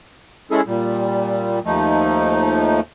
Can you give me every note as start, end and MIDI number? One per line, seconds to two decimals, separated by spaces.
0.51 0.61 56
0.51 0.61 61
0.51 0.61 64
0.51 0.61 68
0.51 0.61 69
0.67 1.60 46
0.67 1.60 55
1.65 2.80 39
1.65 2.80 53
1.65 2.80 57
1.65 2.80 63